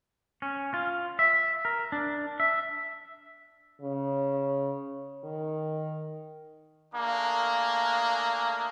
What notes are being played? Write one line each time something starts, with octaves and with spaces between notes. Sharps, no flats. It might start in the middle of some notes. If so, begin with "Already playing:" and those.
C#4
F4
E5
A#4
D4
E5
C#3
D#3
A3 A#3 D4 G#4